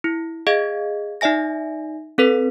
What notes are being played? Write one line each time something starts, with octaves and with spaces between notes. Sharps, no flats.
E4
G#4 D#5 F5 G#6
D#4 D5 E5 G#5 A#6
C4 A4 B4 B6